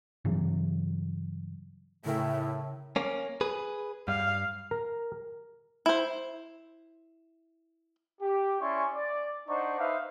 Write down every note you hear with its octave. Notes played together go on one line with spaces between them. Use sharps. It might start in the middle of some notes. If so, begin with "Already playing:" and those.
G2 C#3 E3 F#3
A2 C#3 E4 A#4 G5
A#3 C#4
G#4 B4
G2 F5
A#4
E4 C5
G4
C#4 E4 D5 G#5 C6 C#6
D5
D4 D#4 C5 D5 F#5 C#6
D#4 B4 C5 E5 F5